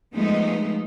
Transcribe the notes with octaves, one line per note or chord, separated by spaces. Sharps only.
F3 G#3 A3 B3 D#4